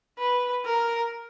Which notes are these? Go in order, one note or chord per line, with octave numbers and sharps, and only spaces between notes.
B4
A#4